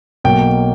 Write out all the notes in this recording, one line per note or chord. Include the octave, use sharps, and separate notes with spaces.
B1 B2 F#3 A#3 G5